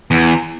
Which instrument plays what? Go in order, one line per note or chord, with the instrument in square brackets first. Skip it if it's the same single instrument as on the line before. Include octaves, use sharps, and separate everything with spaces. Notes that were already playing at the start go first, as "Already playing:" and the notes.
[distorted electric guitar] E2